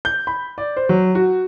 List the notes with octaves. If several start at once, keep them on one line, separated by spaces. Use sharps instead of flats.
G6
B5
D5
C5
F#3
F#4